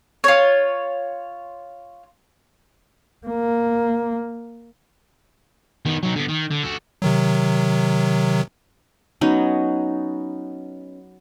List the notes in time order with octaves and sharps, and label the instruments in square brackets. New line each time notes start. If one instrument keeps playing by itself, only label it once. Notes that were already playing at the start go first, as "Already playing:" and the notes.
[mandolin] F4 C#5
[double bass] A#3
[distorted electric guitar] D#3 B3
F#3 D#4
D3 B3
D#3
D3
F#4 A4
[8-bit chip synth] C3 D#3 F#3
[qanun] F#3 B3 C#4 D#4